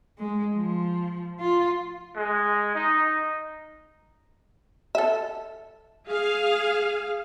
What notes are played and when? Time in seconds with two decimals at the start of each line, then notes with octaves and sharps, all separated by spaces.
0.19 G#3
0.55 F3
1.40 F4
2.16 G#3
2.75 D#4
4.95 A4 E5
6.07 G#4 F5